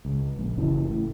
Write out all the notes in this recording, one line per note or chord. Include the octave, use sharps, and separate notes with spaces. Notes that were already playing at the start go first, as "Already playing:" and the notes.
C#2
A#1
F#1 C#3 E3
A2